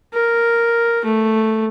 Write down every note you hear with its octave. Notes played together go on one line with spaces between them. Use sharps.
A#4
A3